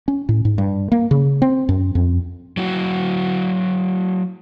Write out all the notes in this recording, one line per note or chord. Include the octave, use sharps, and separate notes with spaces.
C#4
A2
G#2
G2
A#3
C#3
C4
F#2
F2
F#3 E4 F#4